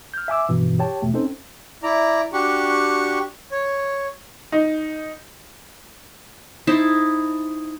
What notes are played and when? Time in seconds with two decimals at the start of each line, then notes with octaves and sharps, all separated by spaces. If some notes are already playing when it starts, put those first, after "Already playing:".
0.14 F6 G6
0.28 E5 G#5 D6 E6
0.49 G2 B2 E3
0.79 G4 C#5 G5 A5
1.02 E2 B2 A3
1.14 C4 C#4 D#4 A4 C5
1.83 E4 D5 A#5
2.33 D4 F#4 G4 C#6
3.51 C#5
4.52 D#4
6.67 D#4 E4 C5 A5